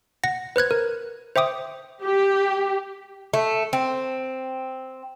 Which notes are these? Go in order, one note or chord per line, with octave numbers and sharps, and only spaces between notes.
F#5 A#6
B4 C5 F#6 G#6
A#4
C5 E5 G5 D6 D#6
G4
A3
C4